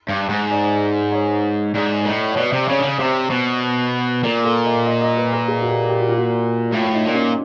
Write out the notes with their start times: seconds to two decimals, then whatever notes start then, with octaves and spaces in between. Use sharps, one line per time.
0.08 G2
0.29 G#2
0.50 D5
1.12 C#5
1.74 G#2 D5
2.01 D5
2.05 A2 D#5
2.32 C#5
2.37 B2 D5
2.52 C3
2.68 C#3 C#5
2.79 D3
2.84 C#3
2.99 C3 C5
3.30 B2
4.23 A#2 A#4
4.44 A4
4.65 D#5
4.86 D#5
5.01 D#5
5.17 B4
5.33 A#4
5.48 G#4
5.62 F#4
5.69 G4
5.89 G4
5.99 F#4
6.09 F4
6.18 F#4
6.72 A2 F4
6.94 D#4
7.04 A#2
7.14 C#4